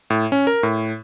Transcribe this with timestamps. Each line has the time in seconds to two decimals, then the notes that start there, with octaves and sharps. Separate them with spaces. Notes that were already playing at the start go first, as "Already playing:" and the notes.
0.10 A2
0.32 C#4
0.47 A#4
0.63 A2